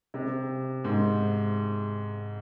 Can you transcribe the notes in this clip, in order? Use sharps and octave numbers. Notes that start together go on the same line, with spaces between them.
C3
G#2